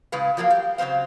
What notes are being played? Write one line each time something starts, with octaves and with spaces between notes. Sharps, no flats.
A2 C#3 G#3 B4 F5
F3 F#3 A#3 A#4 F5
G4
C#3 F#3 C4 C5 F5